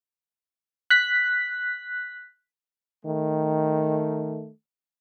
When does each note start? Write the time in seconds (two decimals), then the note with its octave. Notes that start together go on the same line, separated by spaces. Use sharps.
0.90 F#6 B6
3.05 D#3 A3